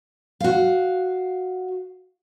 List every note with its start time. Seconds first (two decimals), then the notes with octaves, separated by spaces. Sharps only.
0.40 F#4 F5